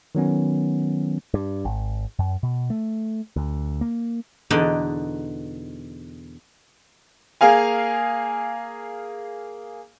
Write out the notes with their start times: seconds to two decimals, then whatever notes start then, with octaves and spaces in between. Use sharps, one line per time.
0.15 D#3 F#3 B3 C#4
1.34 G2
1.65 G#1
2.19 F#2
2.43 B2
2.70 A3
3.36 D2
3.81 A#3
4.50 E2 B2 D3 D#4 D5
7.41 A#3 G#4 F5 G#5